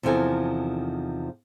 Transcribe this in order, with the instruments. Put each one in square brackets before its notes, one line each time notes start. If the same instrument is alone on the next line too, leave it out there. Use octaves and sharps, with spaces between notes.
[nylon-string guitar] E2 C3 D#3 F3 A4 G#5